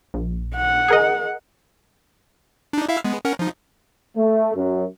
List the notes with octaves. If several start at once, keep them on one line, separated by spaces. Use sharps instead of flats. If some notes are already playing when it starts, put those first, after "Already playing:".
A#1
F#5
G#4 A#4 D#5
D4 D#4
E4 E5 F5
G#3 B3
C#4 A#4 F#5
F3 D#4
A3
F#2